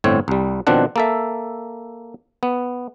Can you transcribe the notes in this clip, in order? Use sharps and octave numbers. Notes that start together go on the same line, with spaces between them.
G1 A2 C4 C#5
C2 G3
B2 D#3 F3 C4 D4 F#5
A#3 A4 E5
B3